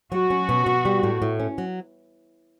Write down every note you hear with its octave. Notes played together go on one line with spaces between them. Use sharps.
F#3 F#4
C#4
B2
B2
G3
A2
A2
C#4
F#3